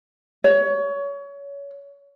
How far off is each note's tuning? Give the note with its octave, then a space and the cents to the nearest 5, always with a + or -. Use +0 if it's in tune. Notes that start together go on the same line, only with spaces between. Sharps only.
C#5 +25